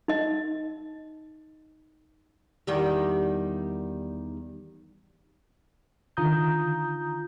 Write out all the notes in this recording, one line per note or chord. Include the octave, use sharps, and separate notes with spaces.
D#4 D#5
E2 D#3 G3
D3 D#3 F4 A#5 D#6 G6